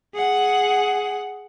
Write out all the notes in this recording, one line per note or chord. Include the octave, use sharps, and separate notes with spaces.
G#4 F#5